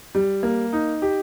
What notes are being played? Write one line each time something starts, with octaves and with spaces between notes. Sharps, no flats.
G3
A#3
D#4
G4